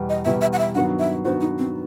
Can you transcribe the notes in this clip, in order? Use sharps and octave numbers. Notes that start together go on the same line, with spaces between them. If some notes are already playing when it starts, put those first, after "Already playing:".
Already playing: E2 B2 G3
D#5
E2 B2 G3 E5
E5
F#5
E5
G2 D#3 F#3 B3 F#4 F#5
E5
G2 D#3 F#3 B3 F#4 C5
D#4
C4